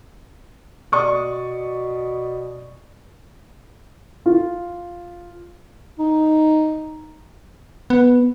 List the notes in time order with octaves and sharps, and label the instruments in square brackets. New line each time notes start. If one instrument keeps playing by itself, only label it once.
[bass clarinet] B2 [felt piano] D5 C#6 D#6
[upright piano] F4
[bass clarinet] D#4
[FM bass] B3